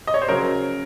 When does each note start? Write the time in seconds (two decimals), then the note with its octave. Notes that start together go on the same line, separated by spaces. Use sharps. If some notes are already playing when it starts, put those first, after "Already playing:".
0.07 D#5
0.14 C#5
0.22 C5
0.28 C#3 F#3 A#4